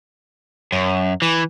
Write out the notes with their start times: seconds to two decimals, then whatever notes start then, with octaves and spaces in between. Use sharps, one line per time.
0.73 F#2
1.22 E3